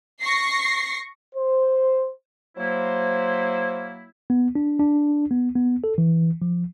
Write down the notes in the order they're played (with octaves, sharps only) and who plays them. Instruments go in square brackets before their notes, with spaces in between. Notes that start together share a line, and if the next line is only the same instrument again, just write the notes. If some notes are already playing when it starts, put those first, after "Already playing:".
[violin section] C#6 A#6 C7
[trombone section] C5
[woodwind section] F#3 A#3 E4 [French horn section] C5
[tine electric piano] B3
D4
D4
B3
B3
A4
E3
F3